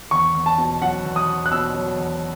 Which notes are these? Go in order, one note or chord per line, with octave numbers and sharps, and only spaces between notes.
E2 C#6
E2
A5
B2
F#3 F#5
E2
D#6
E2
F#6
B2 E6
F#3
E2